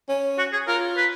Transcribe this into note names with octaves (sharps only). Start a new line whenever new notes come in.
C#4
F#4
G#4
F4 A#4
B4